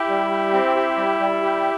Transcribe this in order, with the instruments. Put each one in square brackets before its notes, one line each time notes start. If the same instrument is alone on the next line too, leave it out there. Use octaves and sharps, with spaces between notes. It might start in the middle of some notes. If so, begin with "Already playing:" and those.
Already playing: [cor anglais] E4 [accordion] G4
[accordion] G3
G4
C4
G4
G3
G3
G4